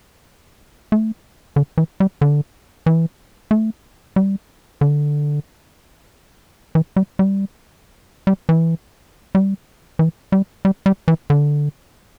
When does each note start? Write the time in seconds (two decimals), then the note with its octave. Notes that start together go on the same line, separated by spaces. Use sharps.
0.92 A3
1.56 D3
1.78 E3
2.00 G3
2.21 D3
2.86 E3
3.51 A3
4.16 G3
4.81 D3
6.75 E3
6.96 G3
7.19 G3
8.27 G3
8.49 E3
9.35 G3
9.99 E3
10.32 G3
10.65 G3
10.86 G3
11.08 E3
11.30 D3